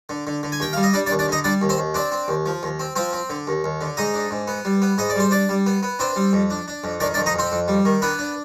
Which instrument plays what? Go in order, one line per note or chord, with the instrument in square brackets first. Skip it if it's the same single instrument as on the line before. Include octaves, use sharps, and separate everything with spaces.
[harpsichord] D3
D3
D3
G#5
D#2 G5
G3 F5
D#5
G3 D4 D5
D4 D5
D#2
D4 D5
D3 D#4 D#5
G3 D4 D5
D#2
C4 C5
D#2
C4 D4 D5
C4
D#2
F3
D#2
C4
F3 C4 C5
C4
D3
D#2
D#2
D3
G#2 D#4 D#5
D4
G#2
B3
G3
B3
G#2 D#5
D5
G3 C5
D4 D5
G3
B3
B3
C4 D4 C5
G3
F2
D4
D4
F2
D#3 D4 D5
D4 D5
F2
D#4 D#5
F2 C4 C5
F2
G3
D#3
B3 D4 B4
D4